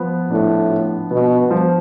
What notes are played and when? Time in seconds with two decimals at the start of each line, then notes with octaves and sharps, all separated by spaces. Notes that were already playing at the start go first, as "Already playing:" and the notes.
Already playing: F3 B3
0.30 A2 D4
0.70 F4
1.11 B2 B3
1.51 F3